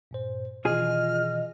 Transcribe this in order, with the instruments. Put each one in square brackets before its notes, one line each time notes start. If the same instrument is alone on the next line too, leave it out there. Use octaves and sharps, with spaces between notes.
[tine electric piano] G2 A#2 C5
[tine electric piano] B2 D#3 E3 [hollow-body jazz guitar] F4 G#4 [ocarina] D#5 [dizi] F6